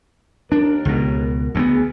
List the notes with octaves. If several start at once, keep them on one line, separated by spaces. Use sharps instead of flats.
D#2 D4 A#4
C#2 B2
D2 A3 B3 G#4